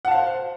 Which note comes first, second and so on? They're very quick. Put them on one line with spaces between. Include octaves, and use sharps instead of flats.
F#5 A5 F5 C5